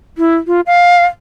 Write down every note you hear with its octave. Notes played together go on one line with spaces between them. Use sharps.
E4
F4
F5